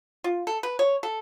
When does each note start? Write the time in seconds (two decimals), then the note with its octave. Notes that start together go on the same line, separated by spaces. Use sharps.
0.24 F4
0.47 A4
0.63 B4
0.79 C#5
1.03 A4